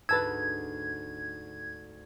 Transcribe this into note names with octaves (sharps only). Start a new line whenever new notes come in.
D2 G#2 B4 A5 E6 G#6